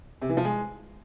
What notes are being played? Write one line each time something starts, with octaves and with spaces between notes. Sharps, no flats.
C3
E3
F3
G#3